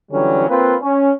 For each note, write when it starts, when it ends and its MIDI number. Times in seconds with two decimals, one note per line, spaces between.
0.12 0.47 50
0.12 0.47 52
0.12 0.47 54
0.12 0.47 55
0.12 0.47 61
0.49 0.75 58
0.49 0.75 60
0.49 0.75 65
0.49 0.75 71
0.81 1.11 61